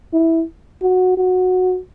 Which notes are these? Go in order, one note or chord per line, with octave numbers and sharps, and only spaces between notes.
E4
F#4
F#4